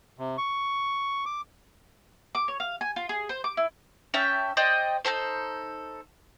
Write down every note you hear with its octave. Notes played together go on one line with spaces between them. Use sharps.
C3
C#6
D6
D6
C#5
F5
G#5
F4
G#4
C5
D6
E4
C#4 E5 G5 A5
C5 D5 D#5 G5
D#4 E4 A4 C5